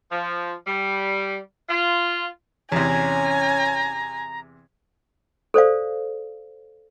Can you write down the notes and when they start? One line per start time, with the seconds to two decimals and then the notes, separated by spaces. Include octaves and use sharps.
0.11 F3
0.67 G3
1.69 F4
2.72 E2 C3 C#4 G#5 A#5
5.54 A4 C5 D5 F5